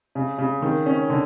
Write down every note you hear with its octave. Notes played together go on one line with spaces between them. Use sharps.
C#3
C#3
D#3
C#4
D3